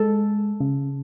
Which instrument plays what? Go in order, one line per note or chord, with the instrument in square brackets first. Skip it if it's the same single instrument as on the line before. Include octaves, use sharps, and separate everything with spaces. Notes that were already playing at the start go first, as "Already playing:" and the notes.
Already playing: [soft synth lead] G#3 [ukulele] A4
[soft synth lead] C#3